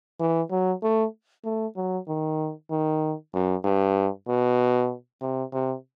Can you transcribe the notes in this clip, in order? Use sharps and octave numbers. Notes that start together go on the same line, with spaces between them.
E3
F#3
A3
A3
F#3
D#3
D#3
F#2
G2
B2
C3
C3